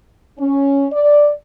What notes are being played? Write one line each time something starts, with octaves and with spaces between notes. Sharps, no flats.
C#4
D5